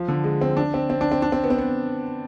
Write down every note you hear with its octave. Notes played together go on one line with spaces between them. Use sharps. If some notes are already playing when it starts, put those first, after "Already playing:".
Already playing: F3
D3
G#3
C4
D4
C4
C4
D4
C4
D4
C4
B3
C4
B3